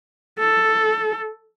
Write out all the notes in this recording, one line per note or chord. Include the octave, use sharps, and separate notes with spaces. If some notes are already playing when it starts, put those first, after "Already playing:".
A4